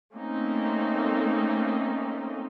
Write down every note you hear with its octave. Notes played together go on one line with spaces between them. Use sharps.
A3 A#3 C4 C#4 D#4